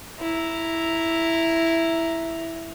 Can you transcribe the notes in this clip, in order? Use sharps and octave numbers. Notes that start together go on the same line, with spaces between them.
E4 A#5